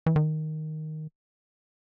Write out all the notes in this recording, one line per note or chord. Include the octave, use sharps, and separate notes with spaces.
E3
D#3